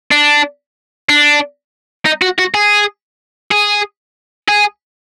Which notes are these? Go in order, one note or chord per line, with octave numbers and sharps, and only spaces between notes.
D4
D4
D#4
F#4
F#4
G#4
G#4
G#4